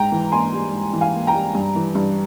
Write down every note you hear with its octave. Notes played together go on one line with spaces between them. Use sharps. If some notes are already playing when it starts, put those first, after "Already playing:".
Already playing: G#2 G5 A#5
E3
A#3 G#5 C6
G3
G#2
E3
F5 G#5
A#3
G5 A#5
G3
G2
E3
G2